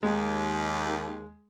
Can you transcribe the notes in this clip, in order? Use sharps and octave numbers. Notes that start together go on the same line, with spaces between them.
D#2 G#3